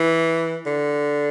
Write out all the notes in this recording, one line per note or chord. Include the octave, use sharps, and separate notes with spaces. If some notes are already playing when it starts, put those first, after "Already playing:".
Already playing: E3
D3